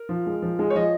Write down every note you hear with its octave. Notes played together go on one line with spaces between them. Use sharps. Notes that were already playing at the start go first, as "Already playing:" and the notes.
Already playing: A#4
F3
G#3
F3
G#3
C#5
F3 D#5